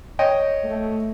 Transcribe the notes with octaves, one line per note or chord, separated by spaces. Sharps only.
C#5 D#5 G5
A3